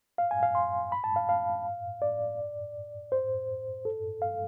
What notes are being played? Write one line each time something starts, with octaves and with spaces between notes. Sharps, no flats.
F5
G#5
F5
C6
B5
A5
F5
F5
D5
C5
A4
F5